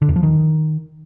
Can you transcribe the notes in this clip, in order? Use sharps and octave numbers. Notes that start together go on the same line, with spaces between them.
D3
E2
F3
D#3